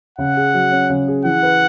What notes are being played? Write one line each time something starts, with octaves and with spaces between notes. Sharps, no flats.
C#3 F#5
G#4
F#3
C#4
C#3
G#4
E3 F#5
B4